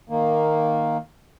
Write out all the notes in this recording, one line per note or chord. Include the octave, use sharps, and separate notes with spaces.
D#3 A#3